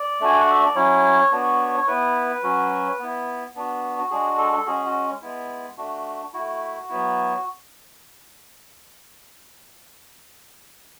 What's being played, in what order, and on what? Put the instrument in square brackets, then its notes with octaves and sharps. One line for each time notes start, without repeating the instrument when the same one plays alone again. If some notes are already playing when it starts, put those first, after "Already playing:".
Already playing: [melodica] D5
A3 D4 F#4 G#5
F#5
E5
D5
F#3 C#4 E4 C#5
B3 D4 F#4
C#5
B3 E4 B4
F#3 C#4 F#4
B3 E4
B3 D4 F#4
F#4
G#3 D4 F#4 G#4
A4
A4
G#3 C#4 F#4 G#4
F#4
G#3 B3 E4
A3 D4 F#4
A3 E4 F#4
F#3 B3 E4